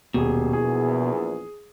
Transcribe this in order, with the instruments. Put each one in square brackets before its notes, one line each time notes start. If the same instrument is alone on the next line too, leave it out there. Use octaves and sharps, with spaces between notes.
[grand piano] D#1 G#4 [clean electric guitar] B2
[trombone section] A#1 E2 [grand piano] G#4